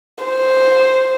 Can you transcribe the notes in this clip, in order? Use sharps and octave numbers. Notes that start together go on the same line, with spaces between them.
C5